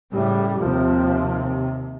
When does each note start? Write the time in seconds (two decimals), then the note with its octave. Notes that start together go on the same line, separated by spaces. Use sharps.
0.12 A2 C#3 G3
0.60 D#2 C3 F3